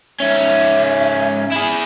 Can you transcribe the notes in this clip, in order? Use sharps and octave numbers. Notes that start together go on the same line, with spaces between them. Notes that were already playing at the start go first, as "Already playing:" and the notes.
G#2 C#4 E5
E4 G#4